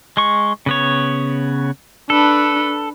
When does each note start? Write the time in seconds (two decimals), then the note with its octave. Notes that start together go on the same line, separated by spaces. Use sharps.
0.17 G#3 C#6
0.66 C#3 B3 C#5
2.10 D4 A4 B4